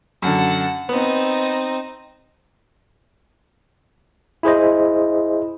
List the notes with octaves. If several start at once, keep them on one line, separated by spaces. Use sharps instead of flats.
F#2 D3 F#5 A5
B3 C4 D#4
E4 G#4 C5 D#5